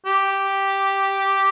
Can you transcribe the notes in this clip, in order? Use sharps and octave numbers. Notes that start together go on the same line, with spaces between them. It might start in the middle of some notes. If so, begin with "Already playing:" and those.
G4